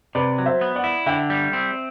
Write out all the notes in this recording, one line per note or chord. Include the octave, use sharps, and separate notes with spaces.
C3 B4 D5
F#3
C5 E5
B3
D5 F#5
E4
D3 E5 G5
G3
C4